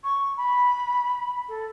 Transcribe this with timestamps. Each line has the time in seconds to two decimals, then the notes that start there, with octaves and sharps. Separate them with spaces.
0.04 C#6
0.37 B5
1.49 A4